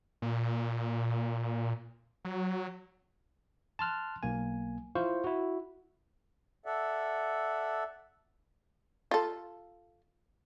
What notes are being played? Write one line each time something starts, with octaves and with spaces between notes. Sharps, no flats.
A#2
F#3
A5 C6 F6 F#6
B1 A#3 G#5
E4 F4 C5 F5 C#6
E4 F#4
A4 D5 E5 F#5
F4 A4